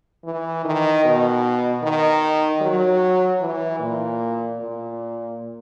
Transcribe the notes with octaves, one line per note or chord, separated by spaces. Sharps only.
E3
D#3
B2
D#3
F#3
E3
A#2
A#2